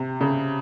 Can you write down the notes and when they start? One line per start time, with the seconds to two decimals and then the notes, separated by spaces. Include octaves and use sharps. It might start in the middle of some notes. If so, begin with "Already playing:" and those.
Already playing: C3
0.21 C#3